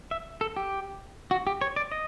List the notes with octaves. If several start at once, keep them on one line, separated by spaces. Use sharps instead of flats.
E5
A4
G4
F#4
G4
C#5
D5
D#5